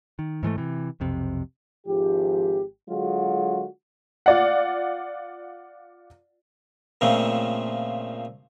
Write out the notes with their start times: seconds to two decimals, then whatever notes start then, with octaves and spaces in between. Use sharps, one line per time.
0.19 D#3
0.43 G#2 E3 G#3 A3
0.58 C3 E3
1.00 B1 F2 C3
1.87 G#1 G#2 F3 G4
2.89 D3 F#3 G#3 F4 F#4 G#4
4.26 F4 D5 F#5
7.01 A#2 C#3 F3 A3 C4